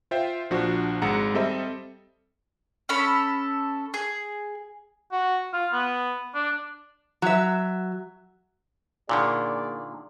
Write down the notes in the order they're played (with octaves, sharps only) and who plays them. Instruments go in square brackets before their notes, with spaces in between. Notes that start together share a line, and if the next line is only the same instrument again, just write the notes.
[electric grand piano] F4 C5 E5 G5
A#1 F3 D4 F#4
G#1 G#3 F#5 A#5 C#7
G3 C4 A4 D#5 E5
[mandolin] C#4 A4 B5
G#4
[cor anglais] F#4
F4
B3
D4
[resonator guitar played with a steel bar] F#3 E5
[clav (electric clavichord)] A#2 D3 D#3 [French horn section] A#3 G#4 D5